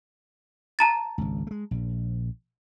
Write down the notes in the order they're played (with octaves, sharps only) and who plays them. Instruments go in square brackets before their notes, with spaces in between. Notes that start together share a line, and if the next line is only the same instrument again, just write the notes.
[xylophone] A5 A#5 A6
[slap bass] G#1 C#2
G#3 A3
A#1